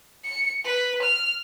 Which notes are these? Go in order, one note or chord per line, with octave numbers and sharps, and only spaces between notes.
C#7
B4
F6